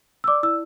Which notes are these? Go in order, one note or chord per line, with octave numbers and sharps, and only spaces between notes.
E6
D5 D6
E4 E6